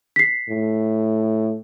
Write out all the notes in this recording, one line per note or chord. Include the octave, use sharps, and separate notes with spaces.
B6 C7
A2